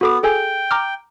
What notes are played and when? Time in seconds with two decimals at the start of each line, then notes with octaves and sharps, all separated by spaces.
0.01 B3 F#4 A4 D6
0.23 G#4 A4 G5 G#5
0.71 A#5 D6 F6